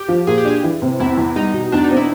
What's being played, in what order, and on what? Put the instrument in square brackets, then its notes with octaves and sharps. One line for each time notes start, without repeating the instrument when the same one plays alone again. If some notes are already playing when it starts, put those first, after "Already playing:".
Already playing: [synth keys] G4
[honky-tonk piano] F3
[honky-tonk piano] A#2 [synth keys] G#4
[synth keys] G4
[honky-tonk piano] D4 [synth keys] G#4
[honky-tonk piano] E3
C3
[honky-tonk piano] E2 [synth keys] E4
[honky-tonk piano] E2
[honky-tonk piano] G3 [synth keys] D#4
[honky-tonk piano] B2
[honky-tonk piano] E2 [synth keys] D4
[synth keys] D#4
[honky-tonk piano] C4
[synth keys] E4